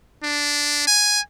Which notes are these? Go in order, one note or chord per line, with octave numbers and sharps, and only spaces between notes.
D4
G#5